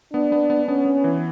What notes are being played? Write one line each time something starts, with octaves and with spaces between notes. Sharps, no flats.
B3 D4
B3
B3
B3 C#4
B3
E3